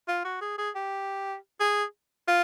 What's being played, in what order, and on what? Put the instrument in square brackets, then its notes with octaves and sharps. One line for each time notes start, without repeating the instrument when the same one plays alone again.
[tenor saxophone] F4
F#4
G#4
G#4
G4
G#4
F4